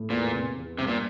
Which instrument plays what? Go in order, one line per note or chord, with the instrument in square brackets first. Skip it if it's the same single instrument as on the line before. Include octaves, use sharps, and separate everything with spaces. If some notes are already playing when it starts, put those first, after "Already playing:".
Already playing: [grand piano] A2
[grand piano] E2 [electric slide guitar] A#2
[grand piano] C3
E2
[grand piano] G2 [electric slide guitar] C3
[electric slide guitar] A#2